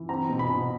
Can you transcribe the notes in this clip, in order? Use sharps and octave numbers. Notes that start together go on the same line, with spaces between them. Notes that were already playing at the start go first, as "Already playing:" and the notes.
Already playing: E3
C4 A#5
B2
B5
B2